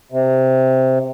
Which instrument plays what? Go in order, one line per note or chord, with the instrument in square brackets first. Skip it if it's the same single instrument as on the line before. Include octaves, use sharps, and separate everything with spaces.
[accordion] C3